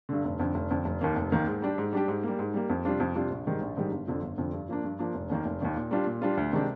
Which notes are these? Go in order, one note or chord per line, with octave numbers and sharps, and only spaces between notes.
G2 D3
F1
F2 D3
F1
F2 D3
F1
D#2 D#3 A#3
F1
D#2 D#3 A#3
G#2
G3 D4 G4
G#2
G3 D4 G4
G#2
G3 A#3
G#2
G3 A#3
F2
C3 G3 D4 F4
F2
C3 G3 D4 F4
A#1
G#2 D#3 G3
A#1
G#2 D#3 G3
G1
F2 D3 F3
G1
F2 D3 F3
G2
F3 A#3 D4
G2
F3 A#3 D4
F1
D#2 D#3 A#3
F1
D#2 D#3 A#3
A#2
G3 D4 F4
A#2
G3 D4 F4
D2
C3 D#3 G#3 D4